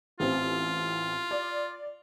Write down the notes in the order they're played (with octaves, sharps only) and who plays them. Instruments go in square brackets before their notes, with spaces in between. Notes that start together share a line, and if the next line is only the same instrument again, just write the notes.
[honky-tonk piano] A1 C4 [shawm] F4
[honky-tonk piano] D5